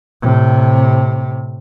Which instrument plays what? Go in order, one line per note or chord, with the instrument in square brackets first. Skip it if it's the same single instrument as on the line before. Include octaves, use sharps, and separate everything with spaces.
[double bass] A2 C3